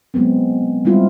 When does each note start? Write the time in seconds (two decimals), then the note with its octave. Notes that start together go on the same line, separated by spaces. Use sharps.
0.14 F#3 G#3 B3 C4
0.85 G3 G#3 C4 E4 F4